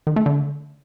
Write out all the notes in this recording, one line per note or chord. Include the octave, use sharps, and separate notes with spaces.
D#3
A3
D3